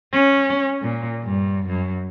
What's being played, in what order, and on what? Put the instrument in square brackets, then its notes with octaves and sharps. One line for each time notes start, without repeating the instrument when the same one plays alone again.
[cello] C#4
A#2
G2
F#2